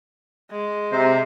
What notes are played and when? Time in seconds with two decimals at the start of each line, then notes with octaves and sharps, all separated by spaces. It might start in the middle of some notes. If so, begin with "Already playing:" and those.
0.51 G#3
0.92 C3 C5 E5 A#5